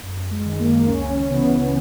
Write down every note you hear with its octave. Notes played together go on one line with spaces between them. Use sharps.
F#2
G#3
D#3
A#3
C#2 C#4
C#3 E3 B3